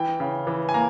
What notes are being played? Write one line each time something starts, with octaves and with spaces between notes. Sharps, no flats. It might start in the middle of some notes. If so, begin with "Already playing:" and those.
Already playing: E3 G5
C#3
E3
G#5
A#3 A#5